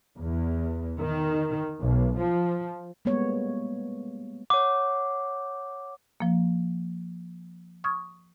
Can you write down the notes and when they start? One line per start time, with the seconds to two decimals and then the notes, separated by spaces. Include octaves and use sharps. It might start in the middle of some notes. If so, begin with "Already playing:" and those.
0.18 E2
1.00 D#3
1.80 B1
2.17 F3
3.05 G3 G#3 A#3 B3 C#5
4.50 C#5 F#5 D6
6.20 F3 A#3
7.84 C#6 D#6 F6 G#6